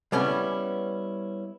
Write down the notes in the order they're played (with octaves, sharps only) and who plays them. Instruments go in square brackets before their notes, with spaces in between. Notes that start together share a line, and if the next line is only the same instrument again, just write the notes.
[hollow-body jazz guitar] G3 B3 C#4 E4